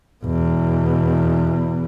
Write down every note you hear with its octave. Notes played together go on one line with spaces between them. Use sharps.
E2 B2